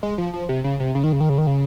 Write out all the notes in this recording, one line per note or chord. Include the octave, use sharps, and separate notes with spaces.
G#3
F3
F3
C3
C#3
C3
C#3
D#3
C#3
D#3
C#3
D#3
C#3